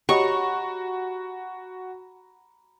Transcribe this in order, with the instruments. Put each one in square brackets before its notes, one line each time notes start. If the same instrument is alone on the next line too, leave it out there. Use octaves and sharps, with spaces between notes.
[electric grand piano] F#4 [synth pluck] G4 C#5 D#5 [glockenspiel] A#5 B5 [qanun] C#6